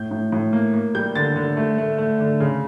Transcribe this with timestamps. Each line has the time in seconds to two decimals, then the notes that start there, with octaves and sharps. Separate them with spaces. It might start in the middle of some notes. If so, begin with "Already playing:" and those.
Already playing: A2 G6
0.11 A2
0.32 A2
0.53 A#3
0.74 A#3
0.95 G3 G6
1.15 D3 A6
1.36 D3
1.57 A3
1.78 A3
1.98 A3
2.20 D3
2.40 C#3